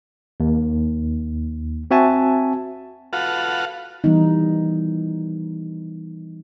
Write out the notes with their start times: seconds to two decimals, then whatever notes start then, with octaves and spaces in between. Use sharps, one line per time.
0.40 D#2
1.91 C4 F#4 E5 G#5 A5
3.13 F4 F#4 A4 B4 F5 F#5
4.04 E3 G3 B3 D#4